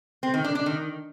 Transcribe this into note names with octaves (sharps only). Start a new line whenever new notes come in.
C4
D#3
D4
D4
D#3